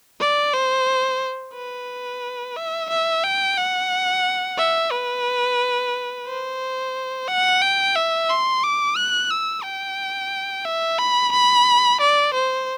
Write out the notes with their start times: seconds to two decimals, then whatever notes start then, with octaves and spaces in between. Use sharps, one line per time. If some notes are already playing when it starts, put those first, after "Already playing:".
0.20 D5
0.54 C5
1.55 B4
2.57 E5
2.90 E5
3.24 G5
3.58 F#5
4.58 E5
4.91 B4
6.26 C5
7.28 F#5
7.62 G5
7.96 E5
8.29 C6
8.63 D6
8.97 F#6
9.30 E6
9.64 G5
10.65 E5
10.99 B5
11.32 B5
12.00 D5
12.34 C5